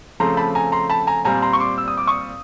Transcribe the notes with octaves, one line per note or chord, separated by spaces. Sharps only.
C#3 F3 A3 C4 A#5 C6
A5 B5
G#5 A#5
A#5 C6
A5 B5
G#5 A#5
A#2 G3 C4 G#5 A#5
A#5 C6
C#6
C6 D6
E6
D#6
D6
C#6 D#6